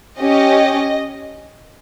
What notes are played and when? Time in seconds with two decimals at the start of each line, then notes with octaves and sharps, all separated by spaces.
0.20 C#4 G4 D#5